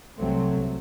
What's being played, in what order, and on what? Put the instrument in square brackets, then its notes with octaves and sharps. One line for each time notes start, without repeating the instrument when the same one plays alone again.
[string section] C2 C3 F#3 C4 [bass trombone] A3